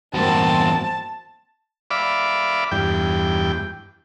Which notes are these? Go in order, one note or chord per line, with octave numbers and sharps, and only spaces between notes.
E2 G2 A#3 C4 F#4 A5
D5 E5 F5 B5 D6
E2 G2 G5